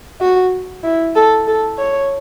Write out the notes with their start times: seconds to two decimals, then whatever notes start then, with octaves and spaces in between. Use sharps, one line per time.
0.21 F#4
0.84 E4
1.15 A4
1.47 A4
1.78 C#5